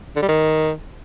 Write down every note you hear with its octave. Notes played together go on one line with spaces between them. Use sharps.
D3
G3
D#3